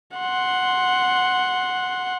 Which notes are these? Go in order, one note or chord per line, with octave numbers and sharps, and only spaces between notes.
F#5 C6